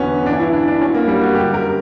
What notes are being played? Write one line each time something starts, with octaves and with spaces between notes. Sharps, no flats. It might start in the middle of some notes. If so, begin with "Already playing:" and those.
Already playing: E2 D3 F#3 B3 C#4
G2 E3 D4
E4
D4
D4
G2 F#3 C#4
A#3
G3
F#4
F#2 D3 F#3 G4
A#4